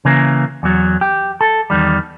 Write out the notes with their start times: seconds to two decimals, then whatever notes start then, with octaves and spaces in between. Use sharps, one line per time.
0.05 C#3 E3 A#3
0.63 E2 F#3
1.01 G4
1.41 A4
1.70 E2 D#3 G3